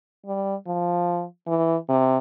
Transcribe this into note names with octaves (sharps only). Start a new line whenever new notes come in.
G3
F3
E3
C3